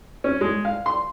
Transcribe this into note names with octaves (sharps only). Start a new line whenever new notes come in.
C#4
G#3
F5
C6